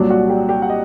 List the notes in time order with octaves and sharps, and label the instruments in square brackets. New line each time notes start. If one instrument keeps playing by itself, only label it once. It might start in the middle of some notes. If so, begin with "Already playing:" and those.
Already playing: [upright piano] C2 A#2 F#3 [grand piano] D4
[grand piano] F#4
G4
G4
F#5
D#5